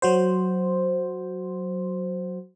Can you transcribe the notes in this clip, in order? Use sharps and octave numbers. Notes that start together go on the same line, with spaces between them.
F#3 F#4 C5